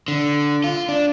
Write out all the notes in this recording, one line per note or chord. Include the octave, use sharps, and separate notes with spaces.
D3
F4
D4